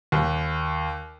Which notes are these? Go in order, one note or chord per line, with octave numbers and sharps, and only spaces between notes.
D#2